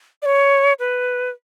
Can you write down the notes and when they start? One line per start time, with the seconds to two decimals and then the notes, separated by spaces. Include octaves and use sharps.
0.22 D5
0.26 C#5
0.79 B4